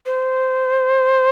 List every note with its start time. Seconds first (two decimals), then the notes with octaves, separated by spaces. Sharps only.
0.06 C5